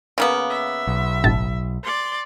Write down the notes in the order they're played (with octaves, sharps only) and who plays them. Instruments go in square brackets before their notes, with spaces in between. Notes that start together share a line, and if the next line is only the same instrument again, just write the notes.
[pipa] C#3 A#3 B3
[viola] E5
[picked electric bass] B1
[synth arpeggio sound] G1 A2 A5
[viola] D5 C6